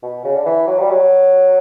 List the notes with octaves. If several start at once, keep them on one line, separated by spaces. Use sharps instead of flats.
B2
C#3
D3
E3
F#3
G3
F#3